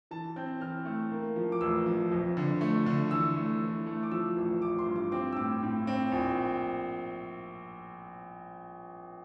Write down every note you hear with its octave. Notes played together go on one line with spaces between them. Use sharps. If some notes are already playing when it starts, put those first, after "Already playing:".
E3 A5
C4 G6
E3 F6
A3
A#3
F3
D6
A1 E6
F3
F2
D3
A3
D3
E3 E6
A3
E3
A3
D6
F3 E6
A1
A1 D6
C6
G2
D6
C4 D6
E6
A2 D6
A2
C4
A#1